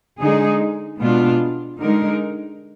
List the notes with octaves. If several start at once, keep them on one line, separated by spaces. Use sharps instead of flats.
D3 G#3 D#4 G#4
B2 G#3 B3 D4 F4
D3 G#3 D#4 A#4